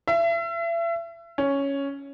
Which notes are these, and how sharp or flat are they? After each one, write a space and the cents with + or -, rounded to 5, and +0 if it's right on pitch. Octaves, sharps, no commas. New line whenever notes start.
E5 +35
C#4 +0